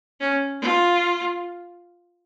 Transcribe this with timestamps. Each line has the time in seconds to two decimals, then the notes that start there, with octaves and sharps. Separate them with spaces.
0.21 C#4
0.61 F4